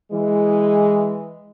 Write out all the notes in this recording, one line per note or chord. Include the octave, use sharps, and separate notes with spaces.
E3 G#3